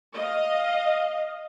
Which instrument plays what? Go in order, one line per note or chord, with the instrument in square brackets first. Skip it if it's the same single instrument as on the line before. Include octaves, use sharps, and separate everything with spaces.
[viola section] D#5 F5